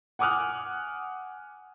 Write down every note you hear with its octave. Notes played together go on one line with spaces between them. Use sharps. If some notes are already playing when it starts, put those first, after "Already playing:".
F#5 G#5 D6 D#6 F6 F#6